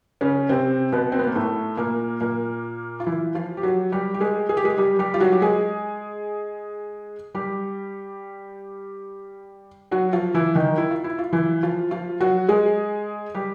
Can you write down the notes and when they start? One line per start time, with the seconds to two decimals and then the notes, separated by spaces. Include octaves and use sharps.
0.21 C#3 C#4
0.49 C3 C4
0.92 B2 B3
1.12 C4
1.19 B3
1.27 A#3
1.35 A2 A3
1.77 A#2 A#3
2.21 A#2 A#3
3.00 F4
3.06 E3 E4
3.35 F3 F4
3.57 G4
3.63 F#3 F#4
3.92 G3 G4
4.14 G4
4.20 G#3 G#4
4.49 G#4
4.57 G4
4.64 G#3 G#4
4.77 G3 G4
4.99 G3 G4
5.14 F4
5.20 F#3 F#4
5.32 G4
5.42 G#3 G#4
7.35 G3 G4
9.91 F#3 F#4
10.13 F3 F4
10.34 E3 E4
10.55 D#3 D#4
10.78 E4
10.91 F4
11.04 E4
11.19 F4
11.33 E3 E4
11.63 F3 F4
11.91 F3 F4
12.20 F#3 F#4
12.48 G#3 G#4
13.35 G3 G4